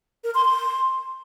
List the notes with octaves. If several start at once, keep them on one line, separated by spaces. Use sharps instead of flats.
A#4
C6
C6